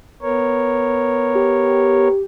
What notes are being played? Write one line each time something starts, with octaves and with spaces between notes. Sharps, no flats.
B3 A#4 C#5
G4